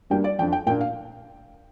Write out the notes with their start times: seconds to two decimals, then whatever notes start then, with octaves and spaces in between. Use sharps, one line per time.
0.10 G2 G3 A#3 D4 G5
0.24 D5
0.39 F2 F3 D4 G5
0.52 G5
0.67 A#2 A#3 D4 G5
0.81 F5